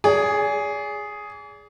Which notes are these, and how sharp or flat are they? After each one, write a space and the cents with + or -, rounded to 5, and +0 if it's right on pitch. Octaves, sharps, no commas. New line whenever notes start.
G#4 +0 D5 -40